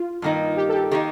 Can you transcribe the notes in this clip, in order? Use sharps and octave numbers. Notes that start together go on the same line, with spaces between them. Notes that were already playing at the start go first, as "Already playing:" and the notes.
Already playing: F4
G2 D#3 A#3 D#4
G4
A4
G4
D#3 A#3 D#4 G4